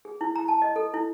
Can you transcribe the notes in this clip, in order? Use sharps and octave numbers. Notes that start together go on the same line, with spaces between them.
G#4
E4
A#5
A5
D#5
A4
E4